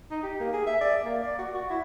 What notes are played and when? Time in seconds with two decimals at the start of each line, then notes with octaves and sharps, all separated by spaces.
0.11 D#4
0.23 G4
0.40 A#3
0.53 G#4
0.67 E5
0.81 D5
1.05 A#3
1.23 D5
1.39 F#4
1.54 F#4
1.70 E4